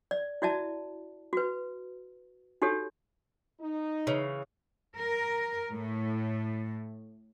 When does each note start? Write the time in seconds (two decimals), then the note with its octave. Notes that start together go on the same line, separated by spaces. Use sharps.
0.11 D5
0.42 E4 F#4 D5 E5 A5
1.33 F#4 B4
2.62 D#4 F#4 G4 A4 C#5
3.59 D#4
4.07 C#3 E3
4.97 A#4
5.73 A2